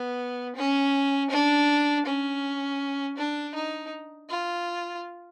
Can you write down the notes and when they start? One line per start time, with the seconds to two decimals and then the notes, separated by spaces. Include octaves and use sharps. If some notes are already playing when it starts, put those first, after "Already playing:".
Already playing: B3
0.55 C#4
1.30 D4
2.05 C#4
3.17 D4
3.55 D#4
4.30 F4